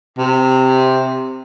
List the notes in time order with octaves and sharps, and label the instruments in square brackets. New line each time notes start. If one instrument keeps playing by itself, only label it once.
[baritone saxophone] C3